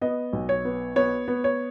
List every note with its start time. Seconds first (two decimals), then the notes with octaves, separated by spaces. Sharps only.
0.01 B3 D#5
0.33 B1
0.49 C#5
0.65 B3
0.96 B3 C#5
1.28 B3
1.44 C#5